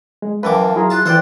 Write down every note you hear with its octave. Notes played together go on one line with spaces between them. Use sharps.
G#3
F#2 E3 B4 F5 G5 A5 D6
F#3 E4 F4 G#4 A#5
F4 A5 F#6
E3 F4 A4 C5 D5 G5